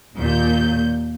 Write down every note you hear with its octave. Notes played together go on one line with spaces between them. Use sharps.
D#2 A#2 G6